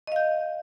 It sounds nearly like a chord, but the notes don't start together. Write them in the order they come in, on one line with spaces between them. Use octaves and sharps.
D#5 F5 G6